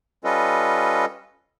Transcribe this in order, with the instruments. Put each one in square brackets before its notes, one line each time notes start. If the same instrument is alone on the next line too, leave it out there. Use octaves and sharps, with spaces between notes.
[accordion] G3 C#4 F4 A4 B4 D#5